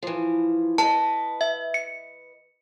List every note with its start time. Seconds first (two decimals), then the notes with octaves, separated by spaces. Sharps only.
0.03 E3 F3
0.78 B4 D#5 A5
1.41 E5
1.74 C#7